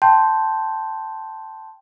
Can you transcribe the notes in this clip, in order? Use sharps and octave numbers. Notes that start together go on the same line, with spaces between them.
G5 A5 C6 G6